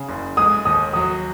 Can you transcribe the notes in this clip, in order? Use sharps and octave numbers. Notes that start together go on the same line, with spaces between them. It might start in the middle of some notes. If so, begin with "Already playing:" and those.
Already playing: C#3 G#4
F#1
G#3 D#6
D#2 D#6
F#3 D#6